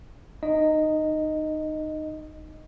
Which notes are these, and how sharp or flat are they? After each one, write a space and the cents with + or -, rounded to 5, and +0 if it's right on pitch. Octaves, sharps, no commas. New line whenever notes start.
D#4 -20 D#5 +0